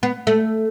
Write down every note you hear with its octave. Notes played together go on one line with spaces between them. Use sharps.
B3
A3